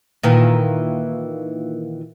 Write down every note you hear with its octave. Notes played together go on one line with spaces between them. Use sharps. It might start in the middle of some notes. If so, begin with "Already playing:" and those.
A#2 D#3 E3